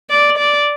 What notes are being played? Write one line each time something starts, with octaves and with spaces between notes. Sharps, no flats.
D5
D5